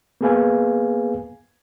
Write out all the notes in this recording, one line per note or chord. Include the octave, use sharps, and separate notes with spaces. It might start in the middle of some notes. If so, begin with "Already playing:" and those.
A#3 B3 G#4 B4 F5 G#5